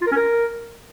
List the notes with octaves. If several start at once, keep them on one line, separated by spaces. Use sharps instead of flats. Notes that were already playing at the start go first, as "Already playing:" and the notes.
F4
A#4
C#4
A#4